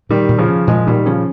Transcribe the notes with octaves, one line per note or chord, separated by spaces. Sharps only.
A#2 D#3 G3
A#2
C#3 F3
C#4
A#2 F3 G#3
A#2 D#3 G3
C#3 F3 C#4